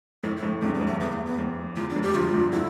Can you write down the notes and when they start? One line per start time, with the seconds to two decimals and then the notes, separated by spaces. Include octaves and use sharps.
0.23 F2 A2 E4
0.37 E4
0.42 F2 A2
0.62 E2 G2 C4
0.75 B3
0.81 F2
0.87 A3
1.00 E2 B3
1.12 A3
1.26 B3
1.38 F2
1.77 E2 F4
1.90 D4
1.96 F2
2.03 G4
2.09 F2
2.15 E2 G2 F4
2.34 E2 G2
2.53 D3 F3 E4